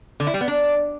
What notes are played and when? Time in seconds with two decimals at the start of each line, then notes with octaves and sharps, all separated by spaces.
0.20 D3
0.27 E4
0.34 G3
0.41 B3
0.48 D4